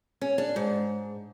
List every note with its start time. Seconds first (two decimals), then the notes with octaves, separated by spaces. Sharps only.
0.21 C#4
0.38 D4
0.56 G#2